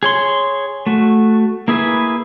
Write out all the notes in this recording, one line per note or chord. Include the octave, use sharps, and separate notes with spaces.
G#4 C#5 C6
A3 F#4
A#3 E4 G#4 B4